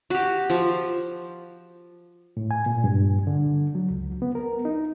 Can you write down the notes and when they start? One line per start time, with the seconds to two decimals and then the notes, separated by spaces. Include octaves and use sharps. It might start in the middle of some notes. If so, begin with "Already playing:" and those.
0.10 F#4 G4
0.50 F3
2.37 A2
2.51 G#5
2.66 A#2
2.84 G2
3.27 D3
3.75 F#3
3.90 C#2
4.22 B3
4.35 A#4
4.65 D#4